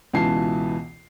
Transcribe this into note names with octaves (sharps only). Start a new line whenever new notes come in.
C#2 B2 E3 F4 A5 C7